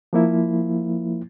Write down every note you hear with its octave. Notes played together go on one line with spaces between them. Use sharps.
F3 A#3 E4